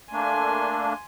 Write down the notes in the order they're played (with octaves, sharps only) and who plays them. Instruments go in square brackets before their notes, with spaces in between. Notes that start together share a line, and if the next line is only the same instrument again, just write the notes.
[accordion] A3 A#3 D4 [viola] G#5 C6